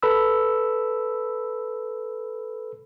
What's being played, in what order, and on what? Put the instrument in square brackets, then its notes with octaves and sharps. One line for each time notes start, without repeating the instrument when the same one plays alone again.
[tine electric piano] A4 B4 B5 E6